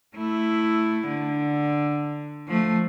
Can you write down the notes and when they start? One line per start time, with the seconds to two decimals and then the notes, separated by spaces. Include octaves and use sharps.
0.16 A3 E4
1.08 D3
2.48 F3 A3